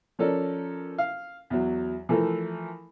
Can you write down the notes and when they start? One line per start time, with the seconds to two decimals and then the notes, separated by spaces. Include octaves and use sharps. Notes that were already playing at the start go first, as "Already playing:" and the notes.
0.19 F3 C#4 A4 A#4 D5
0.98 F5
1.50 E2 F#3
2.09 E3 F3 A3 E4 A4 A#4